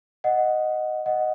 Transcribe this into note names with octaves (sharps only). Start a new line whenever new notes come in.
D#5 F#5
D#5 F#5